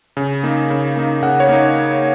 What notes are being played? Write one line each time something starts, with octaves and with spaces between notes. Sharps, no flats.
C#3
A#3 D#4
C#3
A#3 D#4
C#3 F#5
C#5
A#3 D#4